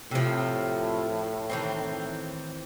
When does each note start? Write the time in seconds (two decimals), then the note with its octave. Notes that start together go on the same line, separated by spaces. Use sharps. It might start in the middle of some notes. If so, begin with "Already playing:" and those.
0.11 A2 C3 F3
1.50 D#3 E3 C4